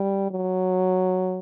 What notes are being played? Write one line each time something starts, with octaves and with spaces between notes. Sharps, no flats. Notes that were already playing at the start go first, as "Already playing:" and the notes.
Already playing: G3
F#3